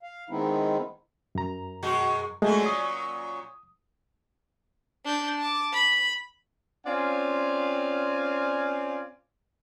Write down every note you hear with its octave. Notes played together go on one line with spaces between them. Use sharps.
F5
D#3 G#3 B3 C4 D#4 E4
F#2 A#5
B2 G#3 F#4
A#2 F#3 G#3 A3 C#4
D#6
D4 G6
A5 D6
B5
C4 C#4 F4 D5 F5 G#5